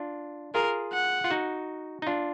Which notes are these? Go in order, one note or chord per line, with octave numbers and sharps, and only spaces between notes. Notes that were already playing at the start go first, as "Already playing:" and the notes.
Already playing: D4 F4
F4 G#4 A#4
F#5
F4
D#4 F#4
D#4
D4 F4